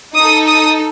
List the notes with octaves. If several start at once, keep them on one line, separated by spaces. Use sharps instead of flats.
D#4 A4 D#6
D#6